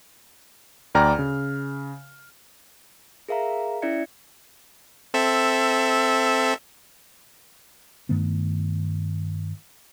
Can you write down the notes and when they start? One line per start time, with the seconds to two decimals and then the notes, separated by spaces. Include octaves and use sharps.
0.95 D2 D5 G5 A#5 F6
1.19 C#3
3.29 G#4 A#4 E5 F5 A#5
3.82 C#4 E4 D5 E5 G#6 C#7
5.14 C4 A4 E5
8.09 G2 D#3 A3 B3